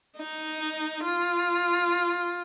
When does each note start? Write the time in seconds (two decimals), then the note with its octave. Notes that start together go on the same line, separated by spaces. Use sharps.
0.18 D#4
1.03 F4